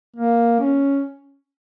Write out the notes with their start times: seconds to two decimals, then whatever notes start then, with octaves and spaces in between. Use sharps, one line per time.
0.16 A#3
0.60 C#4